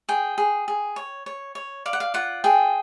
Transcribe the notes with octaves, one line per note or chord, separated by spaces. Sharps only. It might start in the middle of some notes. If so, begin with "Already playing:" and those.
G#4 G5
G#4
G#4
C#5
C#5
C#5
D5 F5
F#5
F5
F4 F#5
G#4 G5